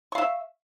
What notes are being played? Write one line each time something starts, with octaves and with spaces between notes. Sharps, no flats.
E5 F5 C#6